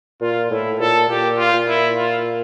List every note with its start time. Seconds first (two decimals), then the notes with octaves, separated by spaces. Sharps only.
0.21 A#2 F4
0.50 A2 E4
0.80 A#2 A4
1.09 A#2 G4
1.38 F4
1.53 A#2
1.68 E4
1.97 F4